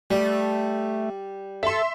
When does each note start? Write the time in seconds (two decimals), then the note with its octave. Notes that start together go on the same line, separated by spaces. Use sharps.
0.11 G3 A3
1.63 A4 E5 C6